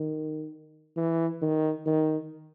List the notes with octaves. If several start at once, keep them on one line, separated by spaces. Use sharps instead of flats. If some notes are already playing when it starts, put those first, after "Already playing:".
Already playing: D#3
E3
D#3
D#3